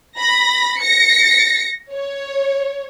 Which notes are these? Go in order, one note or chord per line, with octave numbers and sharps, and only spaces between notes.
B5 A#6
A#6 C#7
C#5